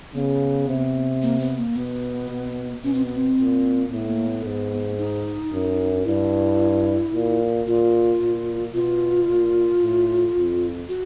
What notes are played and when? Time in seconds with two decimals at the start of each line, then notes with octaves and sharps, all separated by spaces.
0.14 C#3 B3
0.68 C3
1.22 A#3
1.39 B3
1.58 A#3
1.76 B2 B3
2.29 B2
2.83 B2 C#4
2.94 C4
3.04 B3
3.16 C4
3.38 A#2
3.91 A2 B3
4.09 A#3
4.26 B3
4.44 G#2
4.98 D#4
5.52 F#2
6.05 G2 E4
7.14 A#2
7.67 A#2 F4
8.21 A#2
8.74 B2 F4
9.28 A#2
9.82 A2
10.36 F2
10.89 F#4